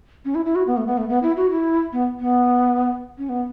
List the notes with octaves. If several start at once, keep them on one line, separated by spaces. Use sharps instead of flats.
C#4
E4
E4
F#4
B3
A3
B3
A3
B3
E4
F#4
E4
B3
B3
C#4
B3